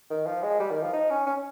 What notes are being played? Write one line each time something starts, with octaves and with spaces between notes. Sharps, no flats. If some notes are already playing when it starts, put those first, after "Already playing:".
D#3
F3
G#3
G3
D#3
F3
D#4
C#4
C#4